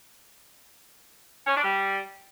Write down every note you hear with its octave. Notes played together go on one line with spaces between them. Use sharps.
C#4
D4
G3